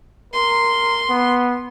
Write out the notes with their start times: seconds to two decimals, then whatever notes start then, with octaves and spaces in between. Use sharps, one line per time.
0.33 A#4 C6
1.09 B3